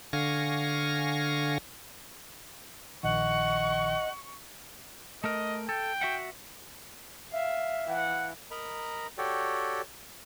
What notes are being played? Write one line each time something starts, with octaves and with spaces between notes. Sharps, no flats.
D3 F5 G#5 C#6 A#6
A#1 D#3 D#5 F#5 C#6
A3 A#4 D#5
A4 G5
F#4 E5 F#5
E5 F5
E3 F#5
A#4 D#5 A#5 B5
F#4 G4 A4 C#5 D5 G5